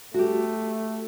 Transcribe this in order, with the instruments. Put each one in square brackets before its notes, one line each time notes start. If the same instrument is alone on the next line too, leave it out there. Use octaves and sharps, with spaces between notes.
[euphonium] A3 [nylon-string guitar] F#4 G4